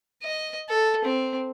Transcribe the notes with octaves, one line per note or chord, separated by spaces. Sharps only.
D#5
A4
C4